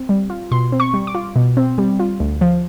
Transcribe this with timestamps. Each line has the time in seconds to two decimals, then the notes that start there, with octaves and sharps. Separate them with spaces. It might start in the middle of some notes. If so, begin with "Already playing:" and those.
Already playing: C4
0.09 G3
0.30 F4
0.51 B2 C6
0.72 C4
0.80 C#6
0.94 G3
1.07 D6
1.15 F4
1.36 B2
1.57 C4
1.78 G3
1.99 F4
2.20 D2
2.41 F3